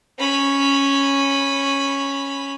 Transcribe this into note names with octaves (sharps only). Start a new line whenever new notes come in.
C#4 B5